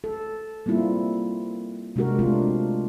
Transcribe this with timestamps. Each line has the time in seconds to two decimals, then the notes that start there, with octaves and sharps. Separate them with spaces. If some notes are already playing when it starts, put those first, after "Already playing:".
0.04 A4
0.66 G3 A#3 C4 E4 F4
1.96 C3 G#3 D4 F#4 G4 A#4
2.19 A3 C4 D4 F4